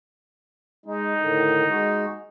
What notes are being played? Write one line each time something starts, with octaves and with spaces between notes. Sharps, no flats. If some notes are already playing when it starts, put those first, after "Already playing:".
G#3 D#4
A2 D3 D#3
G#3 F#4